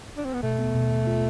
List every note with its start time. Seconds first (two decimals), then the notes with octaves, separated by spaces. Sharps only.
0.17 D4
0.25 C4
0.33 B3
0.43 B2 A3
0.59 B3
0.75 B2
0.91 B2
1.07 F4